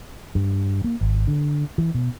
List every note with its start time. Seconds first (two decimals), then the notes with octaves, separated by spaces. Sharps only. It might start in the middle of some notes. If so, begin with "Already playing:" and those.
0.35 G2
0.84 A#3
1.01 G#1
1.27 D3
1.78 E3
1.95 B2